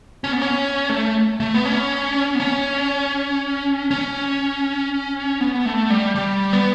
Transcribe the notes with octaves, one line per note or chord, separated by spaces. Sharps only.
C#4
B3
C#4
A3
A3
B3
C#4
B3
C#4
C#4
B3
A3
G3
G3
B3